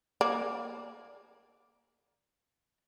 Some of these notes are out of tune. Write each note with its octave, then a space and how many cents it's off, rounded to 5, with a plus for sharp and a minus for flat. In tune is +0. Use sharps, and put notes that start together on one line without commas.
A#3 +10 D5 +0